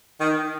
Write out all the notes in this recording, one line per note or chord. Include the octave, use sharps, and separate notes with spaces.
D#3